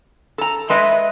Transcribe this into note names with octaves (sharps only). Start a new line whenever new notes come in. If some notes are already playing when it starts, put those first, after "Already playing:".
A4 A#5
G#3 B4 D#5 E5